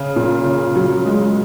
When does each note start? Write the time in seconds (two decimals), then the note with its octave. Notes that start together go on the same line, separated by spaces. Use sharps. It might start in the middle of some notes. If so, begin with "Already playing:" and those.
Already playing: C#3
0.16 A#2
0.45 C#3
0.76 F#3
1.05 G#3